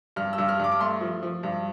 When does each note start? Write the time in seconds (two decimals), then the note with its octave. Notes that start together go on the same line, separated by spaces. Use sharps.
0.16 G2 F6
0.33 E6
0.38 G2
0.49 F6
0.60 G2 D6
0.72 D6
0.80 A3 C6
1.01 F3
1.23 F3
1.43 G2